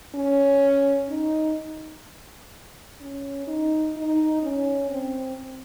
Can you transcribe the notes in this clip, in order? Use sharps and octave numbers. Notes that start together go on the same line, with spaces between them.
C#4
D#4
C#4
D#4
D#4
C#4
C4